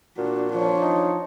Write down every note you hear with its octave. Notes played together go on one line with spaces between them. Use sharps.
A#2 D4 F#4
F3 D4 C#5
D#4